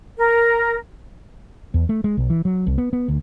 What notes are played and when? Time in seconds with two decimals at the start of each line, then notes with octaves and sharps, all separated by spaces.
0.17 A#4
1.74 E2
1.89 A3
2.04 G#3
2.17 B1
2.30 E3
2.45 F#3
2.67 C2
2.78 B3
2.93 B3
3.08 D2